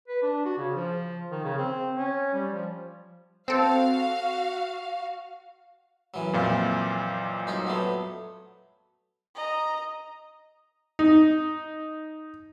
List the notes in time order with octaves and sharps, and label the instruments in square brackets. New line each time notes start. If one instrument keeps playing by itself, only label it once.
[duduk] B4
D4
F#4
C#3
F3
D#3
C#3
C4
C#4
G3
F3
[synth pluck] C4 A4 [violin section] F#4 F5
[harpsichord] F#2 E3 F#3
[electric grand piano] F2 A#2 F5
[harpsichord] F#2 D#4 C5
F#3 A3 B3
[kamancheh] D#5 A#5
[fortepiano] D#4